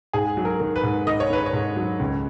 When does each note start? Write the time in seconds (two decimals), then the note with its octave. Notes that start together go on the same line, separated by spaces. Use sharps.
0.14 G#2 G#4
0.37 F#3
0.45 A#4
0.60 D#3
0.76 B4
0.83 G#2
1.07 D#3 D#5
1.20 C#5
1.30 D#3 B4
1.46 C#5
1.53 G#2
1.76 F#3
1.99 C#2